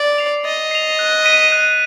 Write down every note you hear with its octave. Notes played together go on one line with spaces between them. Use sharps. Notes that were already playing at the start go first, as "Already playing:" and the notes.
Already playing: D5
C7 F7
D#5 A6
C7 F7
F#6
B6 D#7
F#6